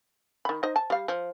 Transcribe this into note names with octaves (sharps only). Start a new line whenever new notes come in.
D#3 B5
D#4 C5 D#5
A5
G3 F5
F3